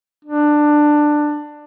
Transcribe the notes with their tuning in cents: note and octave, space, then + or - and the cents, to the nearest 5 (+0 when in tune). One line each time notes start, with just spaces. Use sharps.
D4 +15